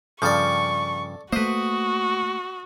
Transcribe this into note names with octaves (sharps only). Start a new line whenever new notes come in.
G2 C#3 F3 A4 D5 C#6
A3 A#3 F#4 B4 C5 D#5